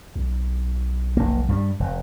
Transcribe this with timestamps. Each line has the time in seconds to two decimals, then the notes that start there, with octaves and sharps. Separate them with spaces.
0.16 B1
1.17 F1 A#3
1.48 G2 F3 G3
1.80 F1